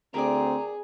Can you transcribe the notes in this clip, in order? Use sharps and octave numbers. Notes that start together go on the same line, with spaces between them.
D2 C4 G#4 A#4 D5 A#5